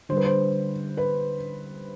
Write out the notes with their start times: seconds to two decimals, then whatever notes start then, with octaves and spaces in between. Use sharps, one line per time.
0.09 D3 G3 C5
0.17 B4
0.24 C5
0.97 B4